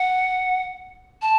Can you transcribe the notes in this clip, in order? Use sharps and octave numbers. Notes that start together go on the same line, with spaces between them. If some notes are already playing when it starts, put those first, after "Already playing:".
Already playing: F#5
A5